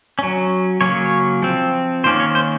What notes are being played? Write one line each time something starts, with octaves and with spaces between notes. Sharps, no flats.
F#3 C#4
C#3 F#3 A#3 C#4 C#5
F3 C4
D#3 A#3 C#4 C5
C#5
C5